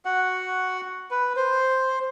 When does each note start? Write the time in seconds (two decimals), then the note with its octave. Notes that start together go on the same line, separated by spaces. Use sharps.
0.05 F#4 F#5
1.11 B4
1.36 C5